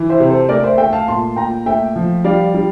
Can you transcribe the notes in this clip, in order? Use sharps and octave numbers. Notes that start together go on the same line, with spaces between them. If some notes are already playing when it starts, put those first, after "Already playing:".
Already playing: E3
C5 E5
C3
A4 C5
A3 A#4 D5
C5 E5
A3 E5 G5
F5 A5
A#2 A5 C6
A#2 G5 A#5
A3 E5 G5
F3
G3 D5 F5
G3